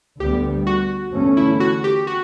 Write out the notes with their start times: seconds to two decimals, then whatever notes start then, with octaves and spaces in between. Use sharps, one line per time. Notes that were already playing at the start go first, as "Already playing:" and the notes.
0.19 D2 D3 G3 B3 G4
0.67 F#4
1.14 E2 D3 A3 C#4
1.37 E4
1.60 F#4
1.84 G4
2.07 F#4